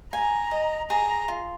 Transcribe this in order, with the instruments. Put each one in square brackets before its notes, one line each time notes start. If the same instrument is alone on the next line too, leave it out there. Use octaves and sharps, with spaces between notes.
[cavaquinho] G#5 [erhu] A#5
[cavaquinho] D#5
[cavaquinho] G#4 [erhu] A#5
[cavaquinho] F4